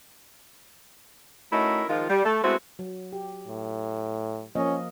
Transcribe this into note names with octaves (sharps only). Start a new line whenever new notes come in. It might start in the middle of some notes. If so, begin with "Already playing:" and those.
A3 C#4 D#4 E4 F#4 A#4
D#3 F3 G#3 F4
G3
A3
G#3 A3 B3 C4 E4 F#4
F#3
G4
A2
F3 A#3 C#4 D#5